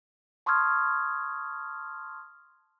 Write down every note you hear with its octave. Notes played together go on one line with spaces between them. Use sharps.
A5 C6 C#6 D#6 F6 G#6